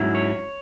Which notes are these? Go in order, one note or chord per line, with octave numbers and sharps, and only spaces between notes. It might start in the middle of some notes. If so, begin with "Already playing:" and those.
Already playing: G#2 F#3 C#4 E4
C#5